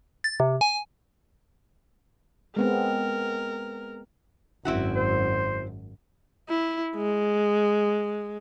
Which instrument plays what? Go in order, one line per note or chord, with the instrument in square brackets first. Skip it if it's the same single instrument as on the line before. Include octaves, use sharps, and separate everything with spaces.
[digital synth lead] A6
C3
G#5
[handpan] G#3 B3 C4 [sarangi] A#4
[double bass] G#1 F#2 [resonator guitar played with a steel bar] C4 E4 F#4
[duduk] C5
[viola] E4
G#3